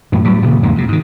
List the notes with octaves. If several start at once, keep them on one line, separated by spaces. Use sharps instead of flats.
F#2 A2 E3
A2 F#3 G3
D#1 A#2 C#3
F#1 E2 G#2 A#3
F2 C3
G#2 D#3